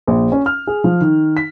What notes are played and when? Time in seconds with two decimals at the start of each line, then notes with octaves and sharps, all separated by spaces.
0.07 A#1
0.32 C#4
0.46 F6
0.67 G#4
0.84 F3
1.01 D#3
1.37 B6